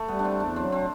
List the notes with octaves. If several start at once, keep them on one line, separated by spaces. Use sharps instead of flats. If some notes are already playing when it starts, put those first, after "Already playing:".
Already playing: A3
G3 B3
D4
C4
E2
D4
F#3 C4
C4